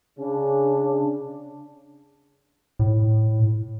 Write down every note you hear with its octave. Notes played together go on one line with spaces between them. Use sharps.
C#3 D4
A2